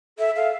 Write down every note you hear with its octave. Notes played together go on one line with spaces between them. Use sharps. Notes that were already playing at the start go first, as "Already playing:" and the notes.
A4 E5
A4 F5